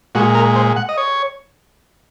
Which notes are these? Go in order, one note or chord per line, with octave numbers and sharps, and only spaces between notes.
A#2 G#3 F#4
A#4
C5
F#5
D#5
C#5